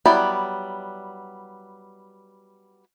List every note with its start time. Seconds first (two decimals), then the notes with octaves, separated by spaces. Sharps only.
0.06 F#3 G3 B3 E4 D5